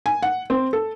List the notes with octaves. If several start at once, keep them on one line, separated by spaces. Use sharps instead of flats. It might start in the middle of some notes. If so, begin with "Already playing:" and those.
G#5
F#5
C4
A4